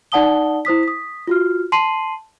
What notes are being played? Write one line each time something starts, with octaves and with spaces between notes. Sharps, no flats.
D#4 D5 F#5 A5 D#6 G7
E4 C5 D#6 B6
D#6 B6
F4 F#4 F6
A5 C6 C7 D#7 F#7